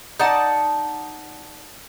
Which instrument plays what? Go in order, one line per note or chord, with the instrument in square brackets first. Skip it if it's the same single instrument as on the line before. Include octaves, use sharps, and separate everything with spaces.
[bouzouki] D#4 D5 F#5 A5